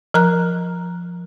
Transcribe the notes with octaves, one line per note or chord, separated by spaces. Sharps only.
F3 A#4 A#5 F#6